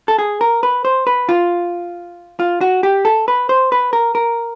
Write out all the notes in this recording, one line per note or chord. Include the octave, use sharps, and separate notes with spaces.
A4
G#4
A#4
B4
C5
B4
F4
F4
F#4
G4
A4
B4
C5
B4
A#4
A#4